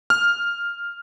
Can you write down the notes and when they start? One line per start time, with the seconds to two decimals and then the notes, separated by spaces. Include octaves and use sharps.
0.10 F6